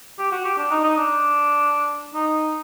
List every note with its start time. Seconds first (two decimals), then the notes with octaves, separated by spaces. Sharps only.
0.19 G4
0.32 F#4
0.45 G4
0.58 D4
0.71 D#4
0.84 D#4
0.97 D4
2.14 D#4